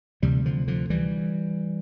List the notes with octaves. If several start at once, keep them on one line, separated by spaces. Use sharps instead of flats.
D2 C3 E3 G3
D3 F3
D3 F3
E3 G3